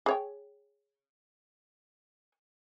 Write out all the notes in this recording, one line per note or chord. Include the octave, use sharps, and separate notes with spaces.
G#4 C#5 G5